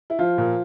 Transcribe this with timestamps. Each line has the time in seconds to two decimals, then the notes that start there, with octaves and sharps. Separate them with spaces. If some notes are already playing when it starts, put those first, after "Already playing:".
0.10 E4
0.19 F3 F4
0.38 A#2